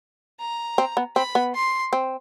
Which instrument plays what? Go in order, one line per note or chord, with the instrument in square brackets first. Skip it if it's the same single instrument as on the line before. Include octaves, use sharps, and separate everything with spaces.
[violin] A#5
[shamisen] C4
B3
[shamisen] C4 [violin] B5
[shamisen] B3
[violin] C6
[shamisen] C4